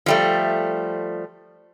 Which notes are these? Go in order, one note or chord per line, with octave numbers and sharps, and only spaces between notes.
F3 G3 A3